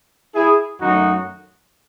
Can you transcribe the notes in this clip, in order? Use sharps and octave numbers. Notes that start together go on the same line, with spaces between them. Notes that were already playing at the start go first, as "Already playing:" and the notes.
E4 G#4
F#2 D#3 F#3 A3 D#4 F#4